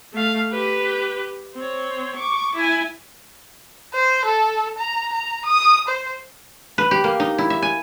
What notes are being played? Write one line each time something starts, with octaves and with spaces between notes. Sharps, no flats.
A3 F5
G4 B4
C4 C#5
C#6 D6
E4 G#5
C5
A4
A#5
A#5
D#6
C5
B4
G4
A#3
D#4
E4
E5
G#5